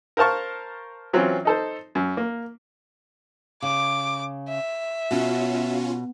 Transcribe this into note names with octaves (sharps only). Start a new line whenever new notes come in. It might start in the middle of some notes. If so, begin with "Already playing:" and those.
A#4 C5 F5 A5 C#6
E3 F#3 C4 C#4 F4
D#4 A4 C5
F#2
A#3
C#3 D6
E5
B2 C#4 F4 F#4